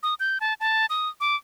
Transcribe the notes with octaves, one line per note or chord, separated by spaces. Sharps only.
D#6
G6
A5
A5
D#6
D6